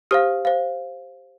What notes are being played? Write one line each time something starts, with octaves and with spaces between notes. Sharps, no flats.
G4 C5 F5 D#6 F6
C5 F5